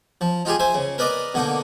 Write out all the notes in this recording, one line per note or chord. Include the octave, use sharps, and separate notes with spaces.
F3
D#4 F4 G4 G#4
C5 E5 G#5
C#3
A#4 B4 D5 D#5 D6
B2 D3 A#3 D#4